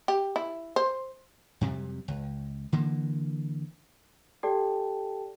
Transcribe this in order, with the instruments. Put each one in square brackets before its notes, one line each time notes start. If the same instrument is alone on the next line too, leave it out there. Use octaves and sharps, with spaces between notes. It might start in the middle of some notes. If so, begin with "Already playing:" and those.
[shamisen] G4
E4
C5
[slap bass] F2 C3 F#3 G3
C#2
D3 E3 A#3
[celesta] G4 A4 D5 G5 A5